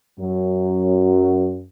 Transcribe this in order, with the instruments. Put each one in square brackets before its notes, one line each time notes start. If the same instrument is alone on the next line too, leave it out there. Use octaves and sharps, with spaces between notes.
[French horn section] F#2 F#3